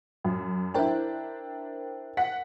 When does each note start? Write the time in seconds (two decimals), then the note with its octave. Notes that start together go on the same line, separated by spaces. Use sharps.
0.24 F#2
0.74 D4 E4 A#4 C5 G5
2.17 F#5 B6